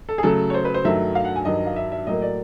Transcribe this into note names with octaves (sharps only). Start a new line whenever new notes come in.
A4
G#4
C#3 F#3 A3 A4
C#5
C5
B4
C5
G2 D#3 F#3 A3 E5
F5
F#5
G#5
G2 D#3 F#3 D#5
F5
E5
E5
A2 F#3 A#3 D#5
D5